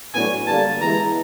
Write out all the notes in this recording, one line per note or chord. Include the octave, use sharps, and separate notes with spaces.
A2 F#3 B3 D4 F#4 G#5
G2 D3 G3 A#3 A5
E3 G#3 B3 E4 A#5